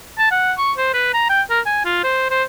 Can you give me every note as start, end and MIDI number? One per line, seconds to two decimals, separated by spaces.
0.19 0.31 81
0.31 0.53 78
0.58 0.73 85
0.78 0.93 72
0.94 1.11 71
1.14 1.26 82
1.30 1.42 79
1.50 1.60 70
1.66 1.81 80
1.85 2.00 65
2.04 2.30 72
2.30 2.43 72